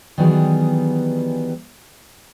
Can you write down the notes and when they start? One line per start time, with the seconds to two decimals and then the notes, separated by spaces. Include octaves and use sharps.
0.18 D#3 E3 F#3 G3 B3 G#4